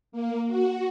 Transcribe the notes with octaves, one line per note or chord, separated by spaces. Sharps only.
A#3
F#4